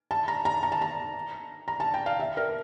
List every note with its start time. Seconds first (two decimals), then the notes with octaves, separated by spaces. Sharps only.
0.11 A5
0.28 A#5
0.45 A#5
0.63 A#5
0.72 A5
0.81 A#5
1.68 A#5
1.80 A5
1.94 G5
2.06 F5
2.20 E5
2.37 A#4